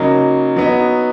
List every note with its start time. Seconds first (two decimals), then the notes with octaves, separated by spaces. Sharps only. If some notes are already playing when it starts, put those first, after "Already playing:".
Already playing: C#3 F#3 A#3 D#4
0.56 F#3 B3 D#4